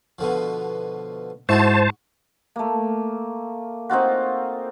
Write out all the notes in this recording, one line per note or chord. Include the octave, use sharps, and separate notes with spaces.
B2 D3 F3
G#2 G#3 E4 F#4 C5 A5 C#6
A3 A#3
C4 D#4 F4 F#4